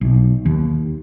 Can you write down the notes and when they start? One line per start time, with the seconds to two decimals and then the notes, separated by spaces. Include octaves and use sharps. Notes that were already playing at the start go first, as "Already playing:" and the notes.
0.01 B1
0.46 D#2